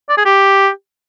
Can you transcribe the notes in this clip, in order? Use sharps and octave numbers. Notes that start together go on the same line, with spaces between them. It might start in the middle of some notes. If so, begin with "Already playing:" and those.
D5
G#4
G4